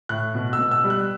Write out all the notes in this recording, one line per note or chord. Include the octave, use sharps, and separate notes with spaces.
A2 F#6
B2
E6
B2
E6
G3
F#6